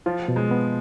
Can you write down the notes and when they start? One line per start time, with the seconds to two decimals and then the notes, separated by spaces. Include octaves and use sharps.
0.06 F3 F4
0.28 B2
0.36 G#3
0.51 B3